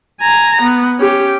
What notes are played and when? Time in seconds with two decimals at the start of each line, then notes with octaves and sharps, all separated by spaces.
0.21 G#5 A#5
0.62 B3
0.99 C#4 G4